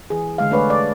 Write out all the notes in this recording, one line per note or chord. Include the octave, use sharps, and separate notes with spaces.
E3 G#4
D3 G#3 F5
A3 D4 G#4 B4 C#5 D5
D5